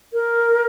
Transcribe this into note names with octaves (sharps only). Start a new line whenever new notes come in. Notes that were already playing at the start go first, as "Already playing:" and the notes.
A#4